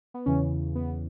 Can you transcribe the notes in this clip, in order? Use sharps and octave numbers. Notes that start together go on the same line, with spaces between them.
B3
E2 C#3 E3 C#4
B3